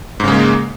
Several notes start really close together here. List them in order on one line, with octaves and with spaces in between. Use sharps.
G#2 C#3 G#3 A#3